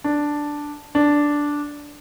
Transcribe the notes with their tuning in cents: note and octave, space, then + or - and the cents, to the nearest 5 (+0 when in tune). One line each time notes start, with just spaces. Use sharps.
D4 +0
D4 -5